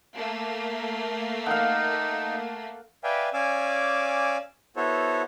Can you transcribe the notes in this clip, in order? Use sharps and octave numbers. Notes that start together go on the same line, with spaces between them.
A3 A#3
D#4 F5 F#5
B4 D5 E5 F5 G5 G#5
C#4 D5 F5 G#5 D6 E6
B3 E4 F#4 A4 C5 C#5